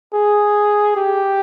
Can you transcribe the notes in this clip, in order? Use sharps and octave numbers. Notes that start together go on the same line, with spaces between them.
G#4
G4